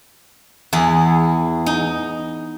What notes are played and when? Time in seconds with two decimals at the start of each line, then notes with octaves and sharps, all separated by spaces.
0.73 E2 E4 G#4
1.66 D#4